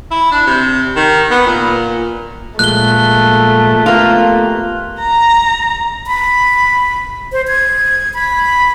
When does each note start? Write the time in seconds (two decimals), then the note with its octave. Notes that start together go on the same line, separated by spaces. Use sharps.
0.11 E4
0.32 D4
0.47 C3
0.96 D#3
1.31 B3
1.46 A#2
2.59 A#2 F3 G#3 A3 F#6 G7
3.86 A#3 B3 F4 G4
5.01 A#5
6.07 B5
7.32 C5
7.48 G#6
8.14 B5